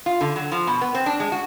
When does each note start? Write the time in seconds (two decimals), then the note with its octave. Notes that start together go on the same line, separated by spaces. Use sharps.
0.06 F4
0.21 D3
0.36 F#3
0.52 F3
0.67 B2
0.81 B3
0.95 C4
1.06 D4
1.20 G#3
1.32 F#4